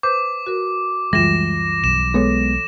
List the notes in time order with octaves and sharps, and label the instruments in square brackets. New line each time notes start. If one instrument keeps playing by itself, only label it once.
[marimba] B4 C5 G6 [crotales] D6
[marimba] F#4 A#4
[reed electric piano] C#2 F#2 [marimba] E3 G3 F4 [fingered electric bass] G#3 [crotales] A#6 E7
[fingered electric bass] B1 [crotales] E7
[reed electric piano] G#3 B3 [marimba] A4 C#5 D6